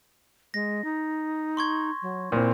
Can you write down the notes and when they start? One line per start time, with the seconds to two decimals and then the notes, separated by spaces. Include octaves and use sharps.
0.54 G#3 A#6
0.84 D#4
1.57 C6 C#6 G#6
2.02 F#3
2.32 A#2 C4 E4